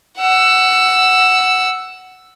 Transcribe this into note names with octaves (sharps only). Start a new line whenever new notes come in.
F#5 E6